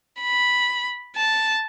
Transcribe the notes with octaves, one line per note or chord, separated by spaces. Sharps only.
B5
A5